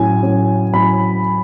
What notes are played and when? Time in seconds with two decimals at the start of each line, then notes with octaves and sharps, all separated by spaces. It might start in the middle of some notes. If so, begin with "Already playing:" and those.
Already playing: A2 F#3 C#4 G#5
0.23 A2 F#3 C#4
0.73 A2 F#3 C#4 B5